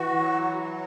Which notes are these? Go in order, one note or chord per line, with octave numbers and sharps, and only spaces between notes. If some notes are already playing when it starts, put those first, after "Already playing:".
Already playing: E3 F#4
F#3
F#3